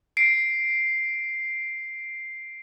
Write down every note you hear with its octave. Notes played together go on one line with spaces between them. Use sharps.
C7 D7